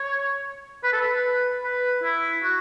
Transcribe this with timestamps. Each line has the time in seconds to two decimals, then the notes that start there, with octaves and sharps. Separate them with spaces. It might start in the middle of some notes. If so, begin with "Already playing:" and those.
Already playing: C#5
0.84 B4
0.93 A4
1.01 B4
1.63 B4
2.04 E4
2.43 F#4